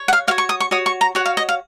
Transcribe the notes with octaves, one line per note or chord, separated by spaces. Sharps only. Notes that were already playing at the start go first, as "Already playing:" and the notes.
Already playing: C#5
F#5
F5
F#4 C#5 F5
C#6
D#6
C#6
F#4 C#5 D#6
C#6
A#5
F#4 C#5 F#5
F5
D#5
F5